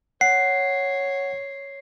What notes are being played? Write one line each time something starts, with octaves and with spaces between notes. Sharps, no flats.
C#5 F#5 C7